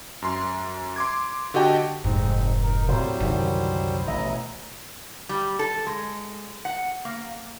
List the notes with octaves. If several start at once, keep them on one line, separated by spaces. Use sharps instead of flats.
F#2 C6
C6 D6 G#6
D3 F#4 G4 D#5 G5 A5
F1 G#2 C4 D#4
D#4 A#4
A2 F#3 G3 C4 C5
C2 F#2 D3 D#3
A1 B2 E4 D#5 A#5
G3
A4
G#3
F#5
A#3